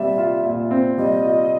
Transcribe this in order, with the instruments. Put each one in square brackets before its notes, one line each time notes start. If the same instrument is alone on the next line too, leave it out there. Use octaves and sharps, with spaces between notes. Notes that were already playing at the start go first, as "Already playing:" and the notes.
Already playing: [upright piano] A#2 G3 C4 [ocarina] E5
[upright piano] F4
A#2
C4
[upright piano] G3 [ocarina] D#5
[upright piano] F4